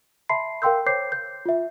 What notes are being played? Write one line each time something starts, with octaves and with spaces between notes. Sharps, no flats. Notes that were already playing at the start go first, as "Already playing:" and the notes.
E5 A5 B5 C6 C7
A#4 F5 G5 C6 E6 G6
C5 C#5 G5 D6 G6 C7
G6
F4 E5